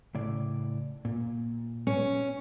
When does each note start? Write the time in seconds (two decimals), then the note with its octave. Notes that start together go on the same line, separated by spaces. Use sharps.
0.15 A2 C#3 D5
1.05 A#2
1.87 C#4